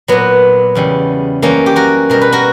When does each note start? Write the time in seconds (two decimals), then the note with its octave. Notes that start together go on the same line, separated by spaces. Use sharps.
0.08 A#2 F#3 B3
0.75 E2 C#3 G3
1.42 F#2 E3 G3 A#3 C#4
1.66 G4
1.76 F#4 A#4
2.10 B2 G3 A#4
2.21 B4
2.32 F#4 A#4